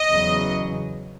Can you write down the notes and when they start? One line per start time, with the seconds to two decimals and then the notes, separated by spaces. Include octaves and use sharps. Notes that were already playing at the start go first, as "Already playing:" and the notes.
Already playing: D#5
0.09 E2 C#3 F#3